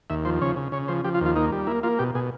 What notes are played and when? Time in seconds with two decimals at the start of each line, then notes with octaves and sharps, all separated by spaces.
0.10 D#2 E5
0.25 F3 C5
0.42 C#3 C#5
0.56 C#3
0.72 C#3 C#5
0.88 F3 C5
1.04 F3 G4
1.14 F4
1.21 D#2
1.26 F4
1.36 A#3 D#4
1.52 G3
1.67 A#3 E4
1.83 A#3 F4
1.99 B2 G4
2.15 B2 G#4